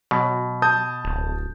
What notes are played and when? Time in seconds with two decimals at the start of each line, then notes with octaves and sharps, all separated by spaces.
0.11 B2 F#3
0.62 A5 D#6 G6
1.05 D1